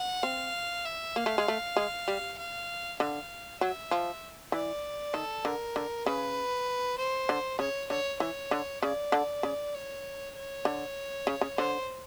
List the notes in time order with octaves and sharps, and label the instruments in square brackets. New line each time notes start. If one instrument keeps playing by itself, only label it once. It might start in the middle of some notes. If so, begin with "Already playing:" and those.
Already playing: [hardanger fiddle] F#5
[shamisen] C4 [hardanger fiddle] F5
[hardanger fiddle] E5
[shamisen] A#3 [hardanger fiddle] F5
[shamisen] A3
G#3
A3
G#3
G3
[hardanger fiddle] F5
[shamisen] D3 [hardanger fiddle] F5
[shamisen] F#3 [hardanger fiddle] E5
[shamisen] F3
[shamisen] E3 [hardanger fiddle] D5
[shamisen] D#3 [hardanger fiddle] A4
[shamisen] D3 [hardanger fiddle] A#4
[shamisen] D3
[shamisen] C#3 [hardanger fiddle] B4
[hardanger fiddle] C5
[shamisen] D3
[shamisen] C#3 [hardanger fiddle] C#5
[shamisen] D3 [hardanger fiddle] C#5
[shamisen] E3 [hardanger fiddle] C#5
[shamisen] D3
[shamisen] C#3 [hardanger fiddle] D5
[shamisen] D3
C#3
[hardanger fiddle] C#5
C#5
[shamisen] D3
C#3
C#3
[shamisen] D3 [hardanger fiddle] C5